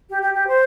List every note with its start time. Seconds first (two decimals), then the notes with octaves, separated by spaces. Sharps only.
0.09 G4
0.22 G4
0.34 G4
0.47 C5